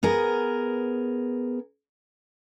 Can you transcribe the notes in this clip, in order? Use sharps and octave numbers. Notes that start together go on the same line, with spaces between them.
B3 G#4 A#4